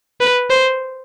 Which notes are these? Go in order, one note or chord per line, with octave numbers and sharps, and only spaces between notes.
B4
C5